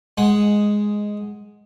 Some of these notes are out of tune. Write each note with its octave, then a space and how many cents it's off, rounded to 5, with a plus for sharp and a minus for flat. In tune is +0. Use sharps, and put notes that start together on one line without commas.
G#3 +0 F#5 +0